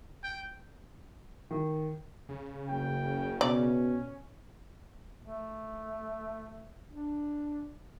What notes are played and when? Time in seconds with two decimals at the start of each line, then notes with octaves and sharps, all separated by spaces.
0.24 G5
1.51 D#3
2.29 C#3
2.68 F#1 G5
3.41 B2 C#4 D5
5.23 A3
6.89 D4